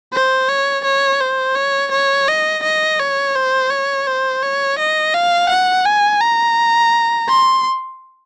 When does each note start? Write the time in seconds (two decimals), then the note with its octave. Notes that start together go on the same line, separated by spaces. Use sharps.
0.13 C5
0.49 C#5
0.84 C#5
1.20 C5
1.56 C#5
1.91 C#5
2.28 D#5
2.63 D#5
2.99 C#5
3.35 C5
3.70 C#5
4.07 C5
4.42 C#5
4.78 D#5
5.13 F5
5.49 F#5
5.85 G#5
6.21 A#5
7.28 C6